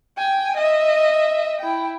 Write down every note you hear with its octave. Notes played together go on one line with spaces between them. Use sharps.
G5 G#5
D#5 E5
E4 G5